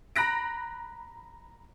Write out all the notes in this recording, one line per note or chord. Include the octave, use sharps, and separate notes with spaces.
A#5 B5 F#6 A#6 D7